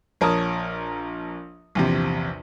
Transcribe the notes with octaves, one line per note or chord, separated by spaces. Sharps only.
A#1 A#4 C#5 A5 D#6
A#1 E2 C3